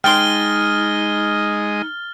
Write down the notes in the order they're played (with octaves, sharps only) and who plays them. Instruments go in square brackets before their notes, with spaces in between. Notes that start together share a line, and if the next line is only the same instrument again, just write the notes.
[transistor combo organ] G#3 D#5 [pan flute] D#4 [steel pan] G5 C6 [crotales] F6 A6 G7